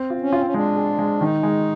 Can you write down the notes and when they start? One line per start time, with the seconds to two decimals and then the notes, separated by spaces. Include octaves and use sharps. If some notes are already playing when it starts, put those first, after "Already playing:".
Already playing: C4
0.10 F4
0.21 C#4
0.33 F4
0.38 C4
0.46 C#4
0.54 G#3 D4
0.76 G#4
0.99 G#3
1.21 D#3 D#4
1.43 G#3